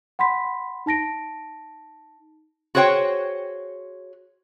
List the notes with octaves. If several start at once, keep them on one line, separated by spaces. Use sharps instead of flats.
F#5 B5 C6 B6
D#4 A5 A#6 D7
F#4 G#4 C5 C#5 G5